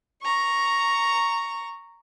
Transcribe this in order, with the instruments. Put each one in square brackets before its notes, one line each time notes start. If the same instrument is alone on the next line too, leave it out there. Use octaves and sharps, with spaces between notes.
[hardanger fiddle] A#5 C#6